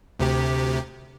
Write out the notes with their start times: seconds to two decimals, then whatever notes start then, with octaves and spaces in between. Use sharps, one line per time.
0.19 D2 C3 G4